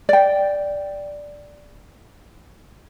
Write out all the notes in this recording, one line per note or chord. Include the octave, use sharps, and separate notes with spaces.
D5 G5